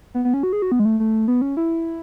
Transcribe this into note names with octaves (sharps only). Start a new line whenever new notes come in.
B3
B3
C#4
F#4
G#4
F#4
B3
G#3
A3
A3
B3
C#4
E4